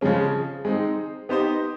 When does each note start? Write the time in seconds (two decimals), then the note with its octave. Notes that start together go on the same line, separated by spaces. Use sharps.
0.01 C#3 F3 G#3 C#4
0.65 G#3 C4 D#4
1.29 B3 D#4 G4 C5 D#5